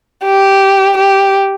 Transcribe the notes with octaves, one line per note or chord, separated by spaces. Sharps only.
G4
G4